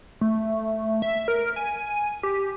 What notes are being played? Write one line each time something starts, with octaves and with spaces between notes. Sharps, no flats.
A3
E5
A#4
G#5
G4